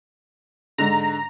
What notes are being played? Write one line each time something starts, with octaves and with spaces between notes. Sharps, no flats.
G#2 D3 A#5